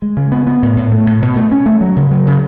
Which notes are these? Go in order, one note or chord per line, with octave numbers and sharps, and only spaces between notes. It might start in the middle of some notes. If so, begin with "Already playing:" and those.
G#3
C#3
B3
B3
A2
A2
A3
A2
B2
A3
C#4
A3
F#3
C#3
F#3
C#3